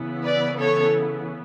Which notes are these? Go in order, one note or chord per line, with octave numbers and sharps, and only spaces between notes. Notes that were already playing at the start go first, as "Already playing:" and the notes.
Already playing: C#3 E3 B3 E4
B4 D5
A4 C#5